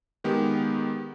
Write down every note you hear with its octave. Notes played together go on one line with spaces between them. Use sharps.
D#3 G#3 B3 G4